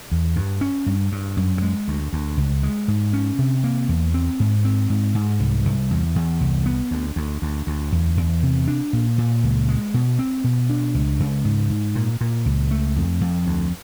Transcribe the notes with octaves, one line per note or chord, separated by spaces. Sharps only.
E2
G2
C#4
G2
G2
F#2
G#3
D2
D2
C#2
G#3
G#2
C#4
C3
A#3
E2
C4
G#2
C4
G#2
G#2
C2
C2
E2
E2
C2
B3
D2
D2
D2
D2
E2
E2
C3
D4
A#2
A#2
C#2
G#3
B2
C4
B2
D4
C#2
C#2
G#2
G#2
A#2
A#2
C#2
A3
F2
F2
D2